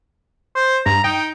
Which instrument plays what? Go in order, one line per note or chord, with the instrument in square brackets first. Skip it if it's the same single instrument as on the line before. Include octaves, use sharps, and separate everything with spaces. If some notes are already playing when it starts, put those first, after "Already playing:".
[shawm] C5
[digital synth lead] G2 [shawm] A#5
[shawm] D#4 [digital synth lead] G5